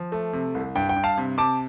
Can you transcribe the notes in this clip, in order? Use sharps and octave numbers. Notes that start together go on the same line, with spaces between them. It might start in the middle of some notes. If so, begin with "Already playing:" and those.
Already playing: F3
A3
C3
C2
G2 G5
G5
G2
F5 A5
C3
C3 A5 D6